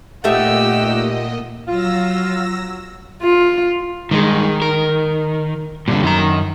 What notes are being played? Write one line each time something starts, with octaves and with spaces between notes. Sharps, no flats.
A#2 A3 D#4 G4 D#5 E5 F#5 E6
F#3 F4 E6 A#6
F4
G2 D#3 G#3
A#4
G2 A#2 D3
F#2 D#3 A#5